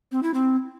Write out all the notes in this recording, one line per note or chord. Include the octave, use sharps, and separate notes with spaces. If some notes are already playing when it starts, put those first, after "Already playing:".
C4
E4
C4